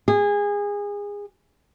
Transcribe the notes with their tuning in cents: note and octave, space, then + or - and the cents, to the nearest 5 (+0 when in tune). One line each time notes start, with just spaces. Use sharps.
G#4 -25